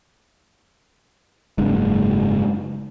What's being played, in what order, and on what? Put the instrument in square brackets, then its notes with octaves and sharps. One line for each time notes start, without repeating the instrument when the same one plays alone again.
[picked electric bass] F#1 G#2